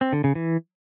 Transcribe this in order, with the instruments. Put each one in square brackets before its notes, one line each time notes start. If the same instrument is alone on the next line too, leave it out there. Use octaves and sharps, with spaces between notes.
[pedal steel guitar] C4
D3
C#3
E3